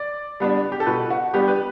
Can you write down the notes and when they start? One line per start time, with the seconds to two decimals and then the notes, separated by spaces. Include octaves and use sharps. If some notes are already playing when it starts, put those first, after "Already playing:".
Already playing: D5
0.40 G3 B3 D4
0.72 G4
0.80 A4
0.86 B2 B4
1.10 F#4
1.34 G3 B3 D4 G4
1.48 B4